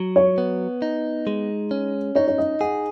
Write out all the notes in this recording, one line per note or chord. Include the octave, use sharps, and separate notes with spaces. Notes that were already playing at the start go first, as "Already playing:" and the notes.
Already playing: F#3
C#5
B3
D#4
G#3
C#4
D#4 C#5
C#5
D#5
G#4 F#5